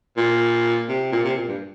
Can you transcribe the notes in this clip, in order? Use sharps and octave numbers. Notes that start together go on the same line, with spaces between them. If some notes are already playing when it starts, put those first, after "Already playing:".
A#2
C3
A#2
C3
A#2
G2